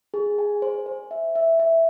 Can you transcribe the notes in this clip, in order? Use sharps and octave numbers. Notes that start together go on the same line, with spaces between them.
G#4
G#5
C5
C5
E5
E5
E5